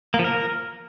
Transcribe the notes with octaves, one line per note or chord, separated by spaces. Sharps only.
A#3
F3
A#4